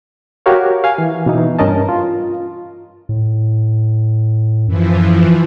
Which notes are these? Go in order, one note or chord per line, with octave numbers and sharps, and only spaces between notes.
F#4 G4 A#4 C#5 F5
F5 G#5
E3
B2 E3 D#4
G2 C#4 A#4 D#5 A5
F4
A2
F#2 E3 F3